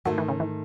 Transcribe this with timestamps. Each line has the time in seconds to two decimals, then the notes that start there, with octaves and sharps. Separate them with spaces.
0.05 G#2 D#3 F#3 A3 D#4 A4
0.18 E3
0.28 C#3
0.40 E3